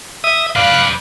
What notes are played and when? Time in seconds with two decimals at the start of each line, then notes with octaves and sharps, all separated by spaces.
0.24 E5 D#6
0.56 B4 D5 F5 F#6